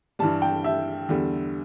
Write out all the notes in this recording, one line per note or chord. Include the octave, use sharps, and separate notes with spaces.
G2 E3 G3 A5
G5
E5
E2 D3 G3